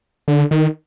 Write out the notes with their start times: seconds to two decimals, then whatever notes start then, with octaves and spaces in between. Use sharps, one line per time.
0.28 D3
0.51 D#3